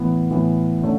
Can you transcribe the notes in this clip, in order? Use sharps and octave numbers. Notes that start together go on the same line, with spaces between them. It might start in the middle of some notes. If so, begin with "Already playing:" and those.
Already playing: A2 E3 B3
A2 E3 B3
D3 A3 C#4